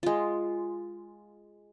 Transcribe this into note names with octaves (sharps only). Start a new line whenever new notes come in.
G#3 F4